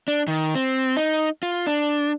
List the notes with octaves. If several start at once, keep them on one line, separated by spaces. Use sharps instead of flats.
D4
D#3
C4
D#4
F4
D4